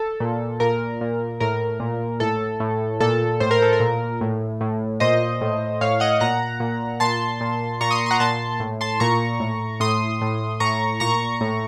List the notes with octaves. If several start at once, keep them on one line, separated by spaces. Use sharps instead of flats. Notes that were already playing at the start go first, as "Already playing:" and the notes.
Already playing: A4
A#2
A#2 A#4
A#2
A2 A#4
A#2
A2 A4
A2
A#2 A4
A2 C5
A#4
A4
A#4
A#2
A2
A2
A#2 C5 D#5
A2
A2 C#5 F5
D#5 F#5
A#2 F#5 A#5
A#2
A#2 A5 C6
A#2
A#2 A#5 C#6
C6 D#6
C6
F#5 A#5
A#2 A5 C6
A2
A5 C6
A#2 A#5 C#6
A2
A2 C6 D#6
A2
A2 A#5 C#6
A#2 A#5 C#6
A2